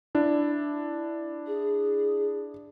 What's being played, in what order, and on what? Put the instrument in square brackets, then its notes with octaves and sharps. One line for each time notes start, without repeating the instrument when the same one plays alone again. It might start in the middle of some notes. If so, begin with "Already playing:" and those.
[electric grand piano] D4 E4
[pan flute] G#4